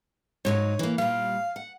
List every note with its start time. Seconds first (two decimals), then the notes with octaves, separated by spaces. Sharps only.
0.45 G#2 F#3 D#4 C#5
0.79 E3 A#3
0.98 A#2 G3 F5
1.56 F#5